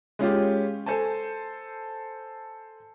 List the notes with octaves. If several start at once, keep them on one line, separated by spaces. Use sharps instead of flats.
G#3 C#4 F4 G4
A4 C5 G#5 A5